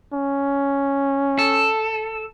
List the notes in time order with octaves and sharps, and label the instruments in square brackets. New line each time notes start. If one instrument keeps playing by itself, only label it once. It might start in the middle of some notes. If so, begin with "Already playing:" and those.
[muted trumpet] C#4
[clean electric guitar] A4